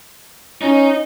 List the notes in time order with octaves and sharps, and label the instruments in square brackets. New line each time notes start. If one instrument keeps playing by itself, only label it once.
[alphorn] C#4 [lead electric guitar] D#4